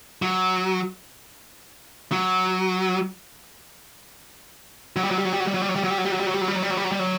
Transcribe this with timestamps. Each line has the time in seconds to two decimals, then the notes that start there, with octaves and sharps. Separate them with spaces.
0.22 F#3
2.12 F#3
4.96 F#3
5.03 G3
5.11 F#3
5.18 G3
5.25 F#3
5.33 G3
5.40 F#3
5.47 G3
5.54 F#3
5.62 G3
5.69 F#3
5.76 G3
5.84 F#3
5.90 G3
5.98 F#3
6.05 G3
6.11 F#3
6.20 G3
6.26 F#3
6.34 G3
6.41 F#3
6.48 G3
6.55 F#3
6.63 G3
6.70 F#3
6.77 G3
6.84 F#3
6.92 G3
6.99 F#3